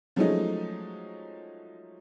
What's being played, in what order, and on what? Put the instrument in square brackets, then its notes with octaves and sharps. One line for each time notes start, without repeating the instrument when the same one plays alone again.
[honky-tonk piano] F3 F#3 G#3 A3 C#4 D#4